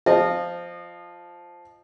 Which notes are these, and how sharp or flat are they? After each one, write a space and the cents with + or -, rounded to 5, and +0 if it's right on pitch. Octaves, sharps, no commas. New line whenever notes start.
F3 +0 D#5 -25